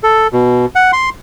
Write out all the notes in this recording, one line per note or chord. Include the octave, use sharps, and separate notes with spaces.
A4
B2
F#5
C6